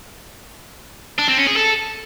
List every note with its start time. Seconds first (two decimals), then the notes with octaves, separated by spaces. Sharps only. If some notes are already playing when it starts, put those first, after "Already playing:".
1.19 D4
1.28 C4
1.37 C#4
1.47 G#4
1.56 A4